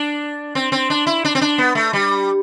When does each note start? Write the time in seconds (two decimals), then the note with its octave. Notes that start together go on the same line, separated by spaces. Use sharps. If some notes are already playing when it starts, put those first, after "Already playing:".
Already playing: D4
0.55 C4
0.72 C4
0.90 D4
1.07 E4
1.25 D4
1.35 C4
1.41 D4
1.58 B3
1.75 A3
1.93 G3